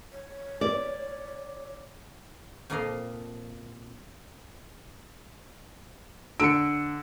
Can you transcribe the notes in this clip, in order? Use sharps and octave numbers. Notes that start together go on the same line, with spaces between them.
C#5
D5
F2 A#2 F3 D5 D#5 F5
D3 E6 C#7 D7